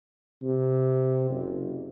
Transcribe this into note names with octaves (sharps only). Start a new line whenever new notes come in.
C3
F#1